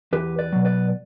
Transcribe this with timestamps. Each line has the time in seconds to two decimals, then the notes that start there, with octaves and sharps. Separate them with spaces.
0.13 E2 G4 B4
0.38 B4 D5
0.53 B2 F#3
0.65 B4 D5